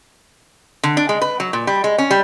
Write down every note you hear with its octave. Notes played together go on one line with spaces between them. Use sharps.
D3
D4
G#3
B4
F#3
A#2
G3
G#3
C#4
G3